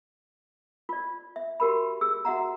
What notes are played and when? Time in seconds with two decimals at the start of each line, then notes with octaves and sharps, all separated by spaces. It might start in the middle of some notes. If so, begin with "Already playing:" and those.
0.89 F4 D5
1.36 E5
1.60 F#4 G4 A#4 B5
2.01 G#4 E6
2.25 F#4 E5 F#5 A#5